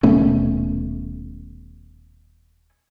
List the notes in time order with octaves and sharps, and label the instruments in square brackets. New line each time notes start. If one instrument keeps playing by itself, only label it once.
[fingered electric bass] D#1 B2 A3 C#4